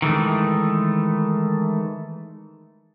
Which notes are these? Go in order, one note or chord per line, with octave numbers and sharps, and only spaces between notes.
D#3 E3 G#3 A3